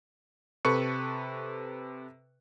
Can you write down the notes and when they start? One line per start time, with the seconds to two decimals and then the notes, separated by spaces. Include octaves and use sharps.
0.65 C3 A4 B4 C#6 F#6 C#7